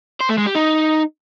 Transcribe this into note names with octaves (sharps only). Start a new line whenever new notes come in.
C5
A3
G#3
G4
D#4